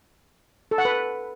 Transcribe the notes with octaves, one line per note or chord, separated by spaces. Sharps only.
A4
F#5
B4